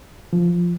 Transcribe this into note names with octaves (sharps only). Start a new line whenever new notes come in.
F3